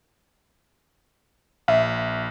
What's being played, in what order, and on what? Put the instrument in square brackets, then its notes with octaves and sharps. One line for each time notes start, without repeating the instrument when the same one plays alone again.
[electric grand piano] A#1 [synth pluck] E5